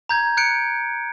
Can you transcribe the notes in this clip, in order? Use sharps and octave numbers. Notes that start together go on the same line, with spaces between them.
A#5 G6 G#6
F#6 G6 C#7 D7